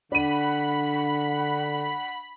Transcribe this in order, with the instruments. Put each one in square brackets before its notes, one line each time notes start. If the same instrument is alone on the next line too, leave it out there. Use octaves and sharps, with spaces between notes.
[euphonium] D3 [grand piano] D4 D#7 [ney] F#5 [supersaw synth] B5